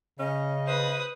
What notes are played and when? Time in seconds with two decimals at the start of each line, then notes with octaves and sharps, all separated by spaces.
0.19 C#3 C#4 D#5
0.67 B4 C5 D#6